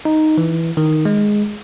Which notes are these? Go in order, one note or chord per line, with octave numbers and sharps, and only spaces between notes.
D#4
E3
D#3
G#3